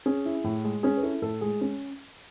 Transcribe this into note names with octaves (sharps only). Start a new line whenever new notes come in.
C#4 G#4
E4
A2
G#3
C#4 G#4
B4
E4 A4
A2 A4
G#3 G#4
C#4